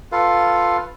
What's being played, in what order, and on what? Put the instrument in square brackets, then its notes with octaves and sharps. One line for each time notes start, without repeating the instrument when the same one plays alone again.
[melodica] F4 A4 B4 F5